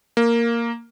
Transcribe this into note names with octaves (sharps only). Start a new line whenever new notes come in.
A#3